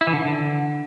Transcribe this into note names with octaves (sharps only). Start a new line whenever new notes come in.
E4
E3
D3
E3
D3